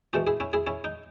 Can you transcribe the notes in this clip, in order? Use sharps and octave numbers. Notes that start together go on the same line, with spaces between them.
G#2 E3 A3 D#4 F#4
E4 G#4
C#4 E4
E4 G#4
C#4 E4
D#4